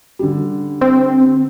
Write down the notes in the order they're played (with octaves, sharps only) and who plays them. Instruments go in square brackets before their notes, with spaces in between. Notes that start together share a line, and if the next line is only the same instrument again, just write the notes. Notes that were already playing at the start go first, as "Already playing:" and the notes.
[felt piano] D3 G3
[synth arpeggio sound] C4